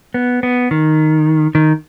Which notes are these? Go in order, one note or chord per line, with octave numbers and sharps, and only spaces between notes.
B3
B3
D#3
D#3